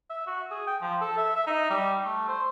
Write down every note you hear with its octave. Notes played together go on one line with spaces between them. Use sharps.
E5
F#4
G#4
G5
F3
A4
E5
E5
D#4
G3
A3
C5